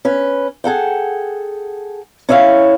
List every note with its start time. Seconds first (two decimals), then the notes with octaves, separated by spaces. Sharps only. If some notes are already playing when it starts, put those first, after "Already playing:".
0.05 C#4 B4
0.64 G#4 A4 F#5 G5
2.29 C#4 E4 C#5 E5 F5